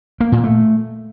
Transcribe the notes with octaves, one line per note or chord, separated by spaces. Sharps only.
A#3
A#2
A3